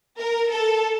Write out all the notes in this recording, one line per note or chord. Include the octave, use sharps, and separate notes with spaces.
A#4
A4